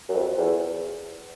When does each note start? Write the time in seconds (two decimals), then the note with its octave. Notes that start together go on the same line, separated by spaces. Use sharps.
0.09 F#2
0.15 F2
0.37 E2